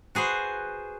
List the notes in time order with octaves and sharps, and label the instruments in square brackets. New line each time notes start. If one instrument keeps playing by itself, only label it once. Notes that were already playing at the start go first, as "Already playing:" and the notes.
[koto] F#4 G#4 B4 C5